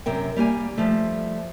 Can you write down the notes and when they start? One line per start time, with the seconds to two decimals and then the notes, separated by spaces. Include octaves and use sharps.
0.06 F#2 C3 A#4 G5
0.36 G3 A#3 G4 G#5
0.78 F3 G3 A3